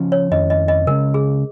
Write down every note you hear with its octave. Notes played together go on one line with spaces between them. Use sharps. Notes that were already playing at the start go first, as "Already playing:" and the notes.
Already playing: C#3 F3 C#4
C#5
F2 D#3 C#4 D#5
D#5
D#5
C#3 G#3 C#4 A#4
G#4